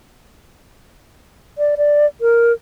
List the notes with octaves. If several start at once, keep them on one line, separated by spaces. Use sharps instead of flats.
D5
D5
A#4